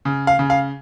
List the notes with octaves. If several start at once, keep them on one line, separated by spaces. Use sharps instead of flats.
C#3
F5
C#3
F5